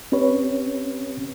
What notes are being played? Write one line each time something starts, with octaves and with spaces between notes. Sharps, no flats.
C4 C#4 G4 B4 C#5